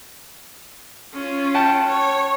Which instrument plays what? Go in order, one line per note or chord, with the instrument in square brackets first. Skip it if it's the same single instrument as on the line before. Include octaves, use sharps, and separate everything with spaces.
[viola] C#4 F4
[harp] F#5 G5 A5
[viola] C#5